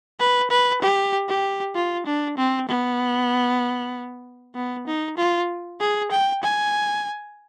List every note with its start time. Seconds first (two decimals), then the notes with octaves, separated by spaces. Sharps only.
0.19 B4
0.50 B4
0.82 G4
1.28 G4
1.75 F4
2.06 D4
2.37 C4
2.68 B3
4.55 B3
4.87 D#4
5.17 F4
5.80 G#4
6.11 G5
6.42 G#5